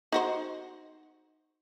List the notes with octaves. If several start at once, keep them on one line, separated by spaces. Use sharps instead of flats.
D#4 F#4 C5